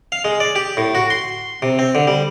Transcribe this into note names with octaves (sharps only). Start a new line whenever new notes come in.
F5
G#3
D5
G4
A2
F#4
C6
C3
C4
D3
G3